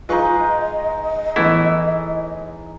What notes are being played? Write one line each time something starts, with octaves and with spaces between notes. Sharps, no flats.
G#3 D#4 F4 B4 D#5 C#6
E2 A2 E3 A3 B3 E4